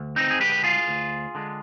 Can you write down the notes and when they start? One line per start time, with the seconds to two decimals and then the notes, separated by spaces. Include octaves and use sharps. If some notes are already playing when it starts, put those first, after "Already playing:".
Already playing: D2
0.16 C4 D#4
0.31 G#4
0.40 D3 G#3 G4 B4
0.64 F4 G#4
0.88 D2
1.35 D3 G#3